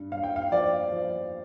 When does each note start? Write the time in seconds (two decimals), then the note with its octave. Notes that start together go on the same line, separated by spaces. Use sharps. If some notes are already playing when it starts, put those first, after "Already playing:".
Already playing: G2
0.12 G2 F5
0.23 G5
0.36 F5
0.52 F3 D5
0.92 F3